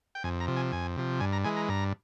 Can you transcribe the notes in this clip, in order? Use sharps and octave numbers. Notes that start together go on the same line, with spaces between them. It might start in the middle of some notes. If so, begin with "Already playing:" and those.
G5
F2 G#5
A#5
C3 F3
G#5
F2 G#5
C3 F3
G2 G#5
A#5
E3 G#3 G#5
A#5
G2 A#5